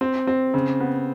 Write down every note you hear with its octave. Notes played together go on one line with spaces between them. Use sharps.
C4
C4
C#3
B3